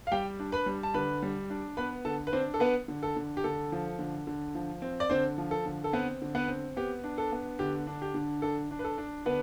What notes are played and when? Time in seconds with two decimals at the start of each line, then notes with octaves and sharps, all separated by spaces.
0.07 F5
0.12 G3 G4 G5
0.39 D4
0.52 B4 B5
0.66 G3
0.83 A5
0.94 D3 B4 B5
1.22 G3
1.50 D4
1.77 B3 B4 B5
2.05 D3 A4 A5
2.27 B4
2.33 C4 D4 C5
2.54 A4
2.60 B3 B4
2.88 D3
3.03 A4
3.16 D3
3.37 G4
3.44 D3 A4
3.72 F3
3.99 D3
4.27 D3
4.55 F3
4.82 C4
5.00 D5
5.10 D3 C4 C5
5.38 F3
5.51 A4
5.66 D3
5.84 A4
5.93 B3 C4 B4
6.22 D3
6.35 B3 B4
6.48 C4
6.77 B3 G4
7.04 D4
7.18 A4
7.32 B3
7.59 D3 G4
7.87 D4
8.02 G4
8.14 D3
8.42 D4 A4
8.71 D4
8.79 B4
8.84 A4
8.98 D4
9.26 D3 B3 B4